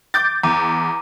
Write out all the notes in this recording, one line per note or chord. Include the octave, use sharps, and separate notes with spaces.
D6 G6 A6
E2 A#5 D6 D#7